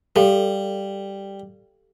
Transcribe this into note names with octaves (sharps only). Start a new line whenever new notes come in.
G3 G4 A4 F5